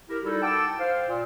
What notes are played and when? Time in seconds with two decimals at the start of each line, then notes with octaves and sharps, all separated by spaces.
0.09 E4 G4 A#4
0.24 G3 D#4 E4 F#4 A4
0.42 F#5 G5 A5 D6 E6
0.79 C5 F5
1.07 A#2